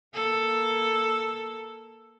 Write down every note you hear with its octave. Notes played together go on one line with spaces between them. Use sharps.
A#3 A4